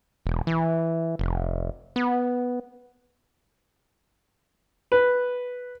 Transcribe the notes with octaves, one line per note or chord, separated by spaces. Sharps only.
E1
E3
F1
B3
B4